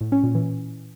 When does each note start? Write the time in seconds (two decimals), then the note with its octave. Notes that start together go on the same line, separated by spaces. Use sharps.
0.01 A2
0.12 C#4
0.24 A#2
0.35 E3